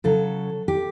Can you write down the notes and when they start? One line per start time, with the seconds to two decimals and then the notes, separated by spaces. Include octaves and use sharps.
0.04 C#3 F#3 A4
0.68 G4